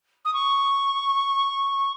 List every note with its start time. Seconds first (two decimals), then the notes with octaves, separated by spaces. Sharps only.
0.25 D#6
0.34 C#6